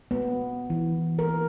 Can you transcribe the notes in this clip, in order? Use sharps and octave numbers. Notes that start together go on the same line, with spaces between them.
B3
E3
A#4